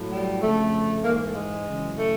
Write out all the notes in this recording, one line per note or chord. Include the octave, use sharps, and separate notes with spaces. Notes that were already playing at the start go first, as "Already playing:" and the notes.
Already playing: A2 F#3
G3
F2 C#3 F3 A3
G#2 E3 A#3
A#3
A3
G#3
F#2 C#3 E3
A3